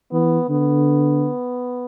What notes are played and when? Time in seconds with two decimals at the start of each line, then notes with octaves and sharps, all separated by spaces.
0.12 E3 B3
0.49 D3 B3